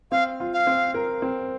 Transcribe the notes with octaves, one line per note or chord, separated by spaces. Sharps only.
C4 F5
F4
F5
C4
A#4
C4